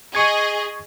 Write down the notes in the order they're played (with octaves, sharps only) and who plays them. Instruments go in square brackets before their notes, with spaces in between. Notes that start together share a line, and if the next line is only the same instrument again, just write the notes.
[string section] G#4 D#5 [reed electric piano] C#6 G#6